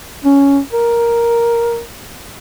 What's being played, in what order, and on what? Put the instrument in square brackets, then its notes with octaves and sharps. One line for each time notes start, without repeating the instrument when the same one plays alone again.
[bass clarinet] C#4
A#4